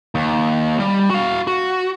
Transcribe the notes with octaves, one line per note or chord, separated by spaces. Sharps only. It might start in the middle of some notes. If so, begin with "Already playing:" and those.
D#2
G3
F#4 F5
F#4